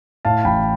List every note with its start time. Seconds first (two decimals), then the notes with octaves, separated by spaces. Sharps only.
0.25 A2 F5 A5
0.45 A1 G5 B5